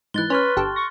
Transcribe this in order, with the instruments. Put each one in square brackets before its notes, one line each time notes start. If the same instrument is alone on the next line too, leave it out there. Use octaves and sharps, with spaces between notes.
[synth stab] G#2 E3 [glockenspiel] F#6 A6 G7
[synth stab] C#4 [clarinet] B4 [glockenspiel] C6 C#6 F6
[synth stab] G1 G4 A4
[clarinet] C#6 [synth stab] A#6